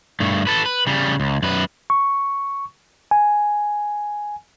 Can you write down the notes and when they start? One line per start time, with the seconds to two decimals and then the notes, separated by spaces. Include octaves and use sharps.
0.20 G2 A3
0.47 A4 B4
0.66 B4
0.87 C#3 G3
1.20 C#2
1.42 F#2 B4
1.90 C#6
3.11 G#5